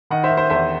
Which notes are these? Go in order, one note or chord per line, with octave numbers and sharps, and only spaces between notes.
D#3 D#5 F#5
C5 E5
D#3
C5 E5
E2 C5 E5